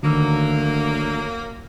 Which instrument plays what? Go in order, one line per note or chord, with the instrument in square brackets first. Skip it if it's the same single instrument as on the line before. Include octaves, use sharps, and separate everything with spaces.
[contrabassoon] D2 [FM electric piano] D3 D#3 E6 [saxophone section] F#3 A#3